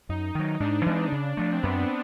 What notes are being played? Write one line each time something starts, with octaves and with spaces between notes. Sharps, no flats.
F#2 D#4
D#3 F#3
G#2 D4
E3 G#3 C4
C#3
F3 A3
C4
F#2 B3